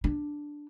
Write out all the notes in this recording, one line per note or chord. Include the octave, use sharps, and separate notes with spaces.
D4